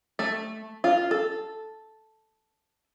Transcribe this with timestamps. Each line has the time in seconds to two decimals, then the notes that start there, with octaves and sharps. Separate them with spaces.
0.19 A3
0.84 F4
1.11 A4